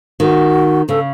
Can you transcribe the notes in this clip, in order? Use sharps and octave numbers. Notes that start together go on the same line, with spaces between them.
D#3 F#4
C#3 A4